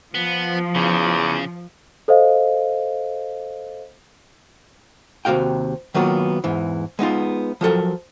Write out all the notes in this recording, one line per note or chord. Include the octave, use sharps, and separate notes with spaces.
F3 B3
E2 C#3
A4 C5 D#5 F5
D#2 C3 F#4 F5 G5
D#3 F#3 A#3 B3 F4
E2 G#2 E3
G#3 B3 D#4 F4
F3 F#3 A4 A#4